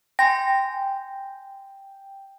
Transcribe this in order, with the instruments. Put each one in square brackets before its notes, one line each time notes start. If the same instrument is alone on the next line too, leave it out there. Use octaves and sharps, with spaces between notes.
[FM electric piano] G5 [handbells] G#5 C6 A#6